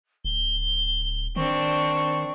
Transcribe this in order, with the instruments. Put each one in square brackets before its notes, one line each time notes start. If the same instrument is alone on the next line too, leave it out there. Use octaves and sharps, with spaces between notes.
[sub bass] D1 [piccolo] G7
[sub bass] D#3 [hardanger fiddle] C4 D4 [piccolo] C#6